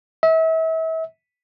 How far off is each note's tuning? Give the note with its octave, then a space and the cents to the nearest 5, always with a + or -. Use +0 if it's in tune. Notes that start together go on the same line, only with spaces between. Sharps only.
E5 -35